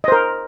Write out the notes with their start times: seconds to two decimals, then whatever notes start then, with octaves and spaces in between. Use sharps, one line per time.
0.04 D#5
0.08 C5
0.12 A#4